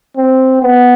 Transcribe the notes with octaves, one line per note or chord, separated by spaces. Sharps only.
C4
B3